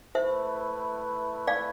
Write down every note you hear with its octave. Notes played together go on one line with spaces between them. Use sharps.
A3 E4 B4 C5 E5
D5 F5